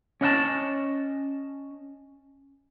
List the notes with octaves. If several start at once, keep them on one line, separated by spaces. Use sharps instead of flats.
C#4 D#5 F5 A5